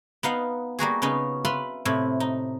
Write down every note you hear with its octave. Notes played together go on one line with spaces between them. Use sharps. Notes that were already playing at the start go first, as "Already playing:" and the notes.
B3 D#4 F5 F#5
G3 A#3 F#4 G#4
C#3 B3 C#4 D#4
B4 E5 F5 B5 C6
A2 C3 E4
D#4